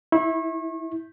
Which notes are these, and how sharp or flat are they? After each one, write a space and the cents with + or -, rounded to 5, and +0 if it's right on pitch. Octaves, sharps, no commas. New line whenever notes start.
E4 -15 C#6 -35